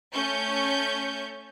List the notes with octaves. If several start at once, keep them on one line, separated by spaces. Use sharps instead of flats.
A3 C#4 C#6 G6